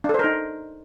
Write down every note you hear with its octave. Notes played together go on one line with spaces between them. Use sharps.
D4 D#4 A4 A#4 C5